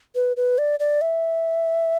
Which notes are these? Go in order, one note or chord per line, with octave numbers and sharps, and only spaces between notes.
B4
B4
D5
D5
E5